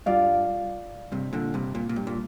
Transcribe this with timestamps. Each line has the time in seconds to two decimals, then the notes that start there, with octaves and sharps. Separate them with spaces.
0.06 G2 F4 D5 F5
1.12 G2 C3
1.33 A#2 D3
1.54 G2 C3
1.75 A#2
1.89 A#2
1.96 G2
2.07 A#2